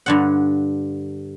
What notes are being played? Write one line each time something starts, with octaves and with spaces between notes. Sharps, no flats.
G2 D3 F#5